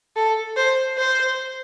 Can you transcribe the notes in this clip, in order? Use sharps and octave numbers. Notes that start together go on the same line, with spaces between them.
A4
C5
C5